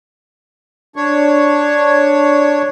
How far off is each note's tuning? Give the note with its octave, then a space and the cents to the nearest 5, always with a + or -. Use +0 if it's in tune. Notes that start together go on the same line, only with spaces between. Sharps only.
D4 +0 C#5 +0